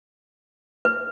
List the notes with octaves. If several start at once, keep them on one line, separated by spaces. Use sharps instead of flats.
B4